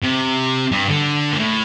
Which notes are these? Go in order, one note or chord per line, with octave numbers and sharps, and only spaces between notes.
C3
G2
D3
A#2
A2